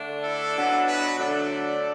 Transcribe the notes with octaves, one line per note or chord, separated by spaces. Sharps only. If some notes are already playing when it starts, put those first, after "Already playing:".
Already playing: D3 A3 D4
E4 A4
B2 F#3 B3 D4
F#4 B4
D3 F#3 A3 D4 A4 D5